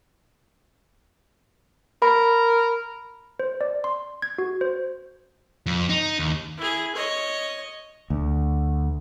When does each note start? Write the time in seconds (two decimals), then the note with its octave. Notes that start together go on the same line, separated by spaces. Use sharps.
2.02 A#4 B5
3.40 C5
3.61 D5
3.84 C6
4.22 G#6
4.38 F#4
4.61 C5
5.66 F2
5.89 D#4
6.19 D#2
6.57 E4 G#4
6.94 C#5 D#5
8.10 D2